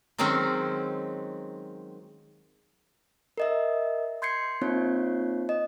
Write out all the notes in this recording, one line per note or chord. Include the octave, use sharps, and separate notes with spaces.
D#3 F#3 G#3 C4 C#4 D#4
A#4 D#5 E5
C6 G6 G#6 C7 C#7
A#3 C4 D#4 F4 C#5
D#5